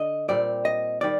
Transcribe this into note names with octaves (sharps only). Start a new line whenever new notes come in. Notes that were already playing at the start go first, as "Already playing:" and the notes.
Already playing: D3 D#5
A#2 G3 C4 D5
D#5
D#3 G3 D5